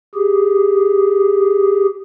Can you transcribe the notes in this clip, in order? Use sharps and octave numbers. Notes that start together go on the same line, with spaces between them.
G4 G#4